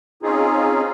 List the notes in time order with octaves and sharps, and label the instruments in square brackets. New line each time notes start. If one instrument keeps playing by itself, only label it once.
[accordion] C4 C#4 D#4 F4 G#4